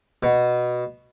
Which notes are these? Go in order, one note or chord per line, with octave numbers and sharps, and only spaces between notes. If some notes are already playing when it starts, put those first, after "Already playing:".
B2